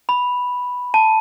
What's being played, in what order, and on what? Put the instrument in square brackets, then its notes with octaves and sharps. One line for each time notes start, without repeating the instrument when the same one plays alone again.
[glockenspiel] B5
A5